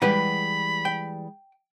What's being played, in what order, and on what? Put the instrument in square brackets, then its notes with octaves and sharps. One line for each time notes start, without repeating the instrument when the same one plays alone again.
[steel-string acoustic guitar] E3 G3 G#3 [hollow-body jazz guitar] G4 B4 F#5 [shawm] B5
[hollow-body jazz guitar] G5